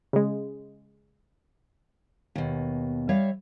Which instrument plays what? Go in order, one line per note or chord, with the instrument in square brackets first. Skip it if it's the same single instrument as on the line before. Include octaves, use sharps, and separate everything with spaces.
[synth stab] C#3 G#3
[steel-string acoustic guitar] D#2 B2
G3 C#5 E5 F5